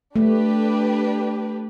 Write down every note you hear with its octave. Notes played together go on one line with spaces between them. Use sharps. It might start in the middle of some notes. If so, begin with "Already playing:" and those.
A3 D4 G4 B4